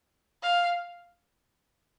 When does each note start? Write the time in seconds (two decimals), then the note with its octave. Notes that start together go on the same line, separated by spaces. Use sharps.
0.43 F5